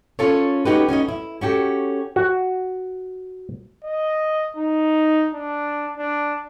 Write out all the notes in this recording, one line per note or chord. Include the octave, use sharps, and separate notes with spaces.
C#4 F4 A4 A#4 C#5
C#4 D#4 F#4 G4 A#4 B4
C#4 D#4 F#4 D#5
E4
C#4 F#4 G4 A4
F#4
D#5
D#4
D4
D4